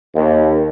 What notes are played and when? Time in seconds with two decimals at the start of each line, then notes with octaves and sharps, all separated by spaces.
0.15 D#2